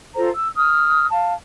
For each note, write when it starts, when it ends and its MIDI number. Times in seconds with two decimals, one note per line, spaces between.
0.15 0.28 65
0.15 0.28 69
0.15 0.28 72
0.15 0.28 82
0.34 0.49 88
0.56 1.06 87
0.56 1.06 89
1.11 1.34 77
1.11 1.34 81